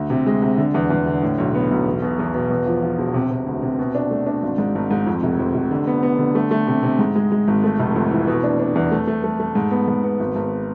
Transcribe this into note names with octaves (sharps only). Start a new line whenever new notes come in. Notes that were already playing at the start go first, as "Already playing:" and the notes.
Already playing: D2
C3
G#3
C3
D3
E2
E2
D3
A2
B1
B3
B1
E2
B2
E2
B2
E2
F3
F3
E1
C3
C3
D2
C3
B2
D4
A3
D4
G#1
G#2
G#1
G#2
F2
F1
F2
F1
D3
B3
B3
D3
A3
A3
C3
C3
G#2
G#3
G#3
G#1
A3
F1
F2
E3
B2
D4
D4
E2
A3
A3
A3
A3
G#2
B3
G#2
B3
G#1
G#1